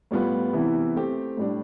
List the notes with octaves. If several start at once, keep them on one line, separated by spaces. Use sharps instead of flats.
A2 G3 B3 F4 B4
C3 E3 B3 E4
A3 C4 G4
A2 G3 D4